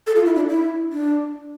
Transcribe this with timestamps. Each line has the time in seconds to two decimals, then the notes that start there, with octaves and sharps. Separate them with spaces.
0.07 A4
0.16 F4
0.26 E4
0.35 D4
0.50 E4
0.93 D4